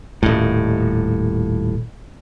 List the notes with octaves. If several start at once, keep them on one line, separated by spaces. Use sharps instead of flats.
D#1 A2